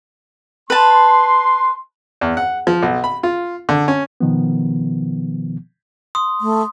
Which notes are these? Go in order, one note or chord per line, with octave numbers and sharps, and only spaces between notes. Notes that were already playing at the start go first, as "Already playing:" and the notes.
B4 A5 C6
E2
F#5
F3
B1
B5
F4
D3
C#4
B2 D#3 F3 B3
C6 D#6
A3